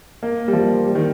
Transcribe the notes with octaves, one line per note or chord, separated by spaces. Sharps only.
A#3
G3
F3
G3
D#3